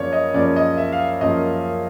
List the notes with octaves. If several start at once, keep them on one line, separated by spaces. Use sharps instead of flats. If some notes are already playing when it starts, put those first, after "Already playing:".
Already playing: F#2 C#3 F3 A#3 C#4 C#5 D5
D#5
F#2 C#3 F3 A#3 C#4 D5
D#5
E5
F5
E5
F#2 C#3 F3 A#3 C#4 D#5